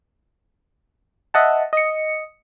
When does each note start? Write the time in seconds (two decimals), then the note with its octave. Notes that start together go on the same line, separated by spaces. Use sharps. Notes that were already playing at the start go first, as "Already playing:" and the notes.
1.34 D#5 E5 F#5 A5
1.73 D#5 C#7